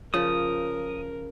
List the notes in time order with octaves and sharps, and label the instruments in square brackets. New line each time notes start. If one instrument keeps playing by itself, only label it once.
[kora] C#3 F3 [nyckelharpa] A#4 [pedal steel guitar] D#6